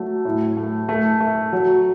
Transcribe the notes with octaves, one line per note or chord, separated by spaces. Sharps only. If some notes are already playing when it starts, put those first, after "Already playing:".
Already playing: F#3 A3
A2
A3
A3
A3
F#3